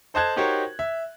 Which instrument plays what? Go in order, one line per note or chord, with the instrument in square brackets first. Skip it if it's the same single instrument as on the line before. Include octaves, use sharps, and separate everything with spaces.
[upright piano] A4 C5 D#5 A5 F#6 G#6
D#4 F#4 G4 A#4 C5 C#5
E5